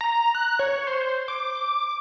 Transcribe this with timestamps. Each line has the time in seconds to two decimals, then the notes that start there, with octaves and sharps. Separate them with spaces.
0.01 A#5
0.35 F#6
0.59 C#5
0.87 C5
1.28 D6